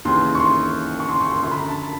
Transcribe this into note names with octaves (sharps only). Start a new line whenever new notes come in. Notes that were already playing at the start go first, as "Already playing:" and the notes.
D#2 C#3 E3 C6
C#6
C6
C#6
C6
C#6
C6
F#2 D3 F3 C6
B5
A#5
A5